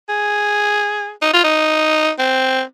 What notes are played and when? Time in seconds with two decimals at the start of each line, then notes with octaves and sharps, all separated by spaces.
0.09 G#4
1.22 D#4
1.34 F4
1.44 D#4
2.19 C4